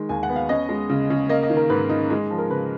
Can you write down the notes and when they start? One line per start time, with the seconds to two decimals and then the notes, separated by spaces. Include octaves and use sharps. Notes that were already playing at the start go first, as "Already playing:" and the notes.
Already playing: D#3 G#3
0.09 D#2 G#5
0.23 F#5
0.29 B3
0.36 F5
0.49 C#4 D#5
0.69 G#3
0.90 C#3
1.10 C#3
1.29 A#3 D#5
1.43 D#5
1.50 D#3
1.57 A#4
1.70 G#2 B4
1.89 D#4
2.10 G#3
2.30 F3
2.38 A#4
2.50 C#3 B4